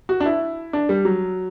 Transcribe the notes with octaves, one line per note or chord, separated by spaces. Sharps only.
F#4
D4
E4
D4
G3
F#3